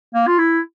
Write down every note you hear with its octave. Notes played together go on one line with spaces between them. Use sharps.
A#3
F4
E4